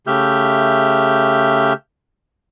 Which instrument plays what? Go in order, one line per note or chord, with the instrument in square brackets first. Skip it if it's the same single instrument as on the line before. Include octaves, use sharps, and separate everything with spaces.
[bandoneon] C#3 A3 G4 E5 F6 G6